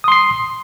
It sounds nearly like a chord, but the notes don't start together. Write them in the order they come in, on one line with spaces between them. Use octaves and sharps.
D#6 C6 C7